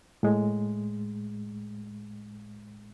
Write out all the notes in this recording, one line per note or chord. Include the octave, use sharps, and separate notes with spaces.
A2 G#3